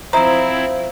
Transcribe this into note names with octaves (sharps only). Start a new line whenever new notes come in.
F3 C4 E4 C5 D#5 E5 A#5